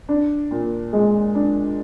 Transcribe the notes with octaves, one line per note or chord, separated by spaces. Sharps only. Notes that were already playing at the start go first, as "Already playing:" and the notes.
D4
A#2
G#3
D4